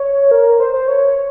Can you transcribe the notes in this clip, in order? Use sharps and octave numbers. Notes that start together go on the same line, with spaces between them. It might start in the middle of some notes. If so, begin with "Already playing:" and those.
Already playing: C#5
A#4
C5
C5
C#5